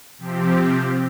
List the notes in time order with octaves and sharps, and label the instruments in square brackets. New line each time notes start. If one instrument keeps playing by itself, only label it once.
[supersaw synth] C3 F3 C4 G4